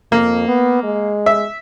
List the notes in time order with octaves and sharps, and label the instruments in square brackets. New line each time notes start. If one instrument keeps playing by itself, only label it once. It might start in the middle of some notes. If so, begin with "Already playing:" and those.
[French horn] F2 [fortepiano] A#3
[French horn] B3
G#3
[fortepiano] E5